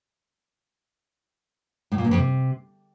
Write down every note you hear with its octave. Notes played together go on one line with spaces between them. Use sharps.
A2
A#2
E2
F2
C3